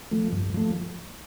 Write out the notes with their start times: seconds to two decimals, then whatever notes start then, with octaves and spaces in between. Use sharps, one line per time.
0.11 F3 A3
0.33 G2
0.54 F3 A3